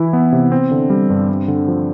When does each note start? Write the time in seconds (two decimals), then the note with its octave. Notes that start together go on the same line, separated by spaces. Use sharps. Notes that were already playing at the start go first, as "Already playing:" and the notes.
Already playing: E3 E4
0.13 B3
0.32 C3
0.52 C4
0.71 D3
0.90 G3
1.10 G2
1.29 C4
1.48 D3
1.68 F3